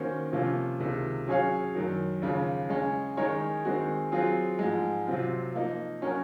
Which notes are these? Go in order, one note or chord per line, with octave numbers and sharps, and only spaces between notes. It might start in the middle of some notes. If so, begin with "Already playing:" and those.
Already playing: D#3 A#3 C#4 F#4 C5
C3 F3 A#3 C#4 F4
C#2 C3 D#3
F#3 C#4 G#4 C#5 F5
F#2 D#3 F#3
D#2 C#3 F3
C#3 G#3 C#4
D#3 G#3 D#4 A#4 C#5
D#3 G#3 C4 F#4
F#3 C4 F4 G#4
G#2 F3 G#3
C3 F#3 C4 F4
F3 A#3 D#4
F#3 C#4 F#4 A#4